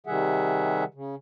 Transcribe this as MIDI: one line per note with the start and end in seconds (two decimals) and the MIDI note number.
0.07 0.84 48
0.07 0.84 51
0.07 0.84 55
0.07 0.84 68
0.07 0.84 76
0.07 0.84 78
0.94 1.15 49